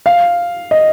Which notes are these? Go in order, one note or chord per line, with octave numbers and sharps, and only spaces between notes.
F5
D#5